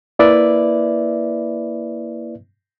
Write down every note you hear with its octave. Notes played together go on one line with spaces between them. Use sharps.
A#3 E4 B4 D5 E5